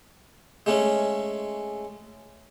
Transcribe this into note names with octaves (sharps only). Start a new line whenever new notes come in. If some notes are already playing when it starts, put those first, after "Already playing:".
G#3 A3 C#4